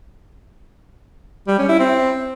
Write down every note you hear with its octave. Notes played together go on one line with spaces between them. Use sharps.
G3
C#4
E4
C4